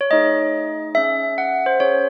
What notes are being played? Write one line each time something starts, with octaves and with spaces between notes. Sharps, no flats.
C#5
A3 D#4 G#4 D#5
C#4 G#4 E5
F#5
C5
C#4 G#4 C#5